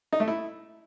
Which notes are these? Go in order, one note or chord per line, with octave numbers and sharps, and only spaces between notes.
D#4
A3
E4